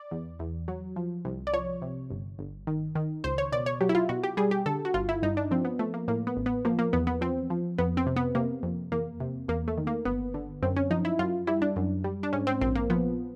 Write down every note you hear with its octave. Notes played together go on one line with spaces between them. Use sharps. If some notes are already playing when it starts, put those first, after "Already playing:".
Already playing: D5
E2
E2
F#3
F3
C2
D5
F3 C#5
C3
G1
G1
D#3
D#3
C#2 C5
C#5
B2 D5
C#5
F#3 G4
E4
F4
B2 F#4
G4
G3 G#4
G4
D3 A4
F#4
G1 F4
E4
G2 D#4
D4
F3 C4
B3
F3 A3
A#3
A2 A#3
B3
A1
B3
F3 A#3
A#3
E2 B3
B3
F3 C4
F3
F2 B3
C4
C3
B3
C3 A#3
F2
E2 A#3
C3
E2 A#3
A3
D#3
A#3
G1 B3
D3
F#2 C4
C#4
F3 D#4
E4
F#2 F4
G3 E4
D4
F#2
G3
D4
G#2 C#4
C4
A#1 C4
A#3
F3 B3